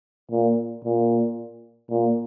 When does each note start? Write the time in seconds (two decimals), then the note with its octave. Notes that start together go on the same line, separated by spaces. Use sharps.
0.31 A#2
0.85 A#2
1.90 A#2